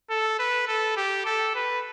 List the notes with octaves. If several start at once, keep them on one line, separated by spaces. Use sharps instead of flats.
A4
B4
A4
G4
A4
B4